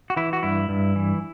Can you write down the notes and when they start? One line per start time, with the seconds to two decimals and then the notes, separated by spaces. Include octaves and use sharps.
0.10 F#4
0.16 E3 E4
0.33 F#4
0.43 G2 E4
0.69 G2
0.96 E3